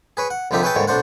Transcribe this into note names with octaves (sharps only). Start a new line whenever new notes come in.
G#4 B4 C#5
F#5
C2 D3 F3 D#4 G4 E5
G#4 B4 C#5 E5 G5 A5
D#2 G#2 D3 G3 C#5
B1 A3 D4 C5 F#5